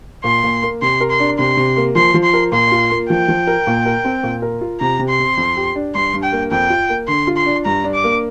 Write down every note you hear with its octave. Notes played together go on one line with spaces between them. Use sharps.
A#2 C6
A#2
A#3
C3 C6
A#4
C6
D4
C3 C6
C3
A#3
F3 C6
F3
C6
A#4
A#2 C6
F4
A#3
F3 G5
F3
A#4
A#2
A#4
C4
A#2
A#4
F4
C3 A#5
C3
C6
C4
F2
G4
D4
G2 C6
G2
G5
A#3
F2 G5
F4
A#3
D3 C6
F4
C6
D4
G2 A#5
D4
D6
A#3